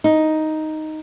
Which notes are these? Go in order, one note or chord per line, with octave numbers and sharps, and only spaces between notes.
D#4